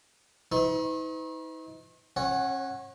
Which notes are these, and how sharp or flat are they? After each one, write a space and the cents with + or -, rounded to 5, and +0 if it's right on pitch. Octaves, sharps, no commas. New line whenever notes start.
D#4 +45 B4 +40 C#6 -40
C#4 -35 C#5 +0 F#5 +0